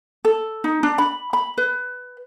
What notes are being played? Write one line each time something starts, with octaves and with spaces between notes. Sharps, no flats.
A4
D#4
D4
B5
B5
B4